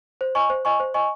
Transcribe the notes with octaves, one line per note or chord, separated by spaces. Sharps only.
C5
D#5 G#5 C#6
C5
D#5 G#5 C#6
C5
D#5 G#5 C#6